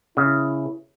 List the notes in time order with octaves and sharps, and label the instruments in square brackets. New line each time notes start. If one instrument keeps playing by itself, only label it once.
[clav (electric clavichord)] C#3 [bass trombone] E4